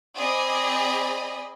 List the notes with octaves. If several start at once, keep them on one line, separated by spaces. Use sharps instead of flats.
C4 G#4 D5 D#5 G#5 B5